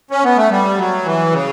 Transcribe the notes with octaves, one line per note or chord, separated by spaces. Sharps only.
C#4
B3
A3
G3
F#3
E3
C#3